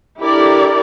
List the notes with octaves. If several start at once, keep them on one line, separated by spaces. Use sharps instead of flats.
D4 E4 G4 A4 A#4 D5